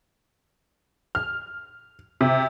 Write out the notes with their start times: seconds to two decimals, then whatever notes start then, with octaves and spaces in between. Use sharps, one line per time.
1.15 F6
2.21 C3